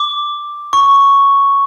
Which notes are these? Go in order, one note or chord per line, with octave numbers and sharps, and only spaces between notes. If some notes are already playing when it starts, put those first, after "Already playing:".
Already playing: D6
C#6